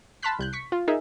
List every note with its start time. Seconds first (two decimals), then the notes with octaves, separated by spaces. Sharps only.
0.23 A5 B5 C6 F6 F#6 B6
0.39 C2 F#6 G6
0.53 C#6 B6
0.72 F4
0.88 D#4 G#4 A#4 E5